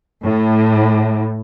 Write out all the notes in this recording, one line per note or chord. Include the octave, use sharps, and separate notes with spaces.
A2